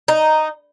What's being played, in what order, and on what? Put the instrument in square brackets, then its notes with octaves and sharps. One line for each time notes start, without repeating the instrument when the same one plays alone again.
[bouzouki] D#4